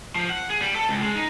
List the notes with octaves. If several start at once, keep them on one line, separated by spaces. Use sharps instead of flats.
F3
F#5
G#4
G3
A4
C#2
G#3
D#4